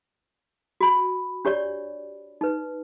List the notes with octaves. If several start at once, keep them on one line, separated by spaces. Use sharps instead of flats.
F#4 B5
D4 G4 C#5 D5
D#4 B4